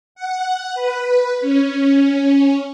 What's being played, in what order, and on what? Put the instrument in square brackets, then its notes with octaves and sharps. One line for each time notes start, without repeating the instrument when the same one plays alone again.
[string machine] F#5
B4
C#4